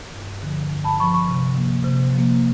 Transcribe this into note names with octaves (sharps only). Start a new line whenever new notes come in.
G2
D3 F3
G2
A5 B5
D3 F3 B5 C#6
B5 C#6
C3
F3 A#3
C3
F3 A#3